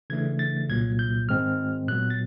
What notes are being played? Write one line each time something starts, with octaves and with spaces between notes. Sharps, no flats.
C#3 E3 A3 D4 G#6
A6
C2 A#2 F#3 A#3 G#6
G6
G#2 D#3 G#3 C4 F6
A#2 F#3 B3 F#6
A6